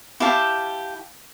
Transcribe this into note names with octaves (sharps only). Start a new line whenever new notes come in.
E4 G4 F5 A5